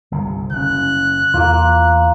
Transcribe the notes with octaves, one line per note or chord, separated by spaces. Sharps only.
G1 C2 C3
F#1 C#3 C#4 F#6
E2 A#3 F4